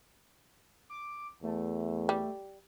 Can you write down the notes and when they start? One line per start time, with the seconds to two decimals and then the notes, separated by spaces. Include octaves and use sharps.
0.90 D6
1.43 E2 A3
2.09 G3